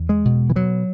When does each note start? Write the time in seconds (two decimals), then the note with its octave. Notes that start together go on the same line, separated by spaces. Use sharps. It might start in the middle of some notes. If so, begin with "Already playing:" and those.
Already playing: E2
0.09 G#3
0.25 B2
0.50 E3
0.56 B2 F#3